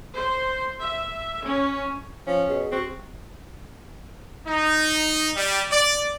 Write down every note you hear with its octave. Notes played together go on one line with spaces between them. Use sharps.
C5
E5
C#4
F3 C#4
B2 G#4
C4 F#4
D#4
G3
D5